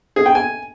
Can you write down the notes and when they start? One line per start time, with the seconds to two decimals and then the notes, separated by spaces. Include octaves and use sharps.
0.16 G#4
0.26 G5
0.35 G#5